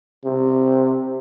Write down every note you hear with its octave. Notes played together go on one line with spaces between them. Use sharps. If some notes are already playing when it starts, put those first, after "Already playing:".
C3